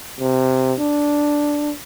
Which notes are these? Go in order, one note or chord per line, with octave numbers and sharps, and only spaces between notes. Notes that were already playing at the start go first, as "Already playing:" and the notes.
C3
D4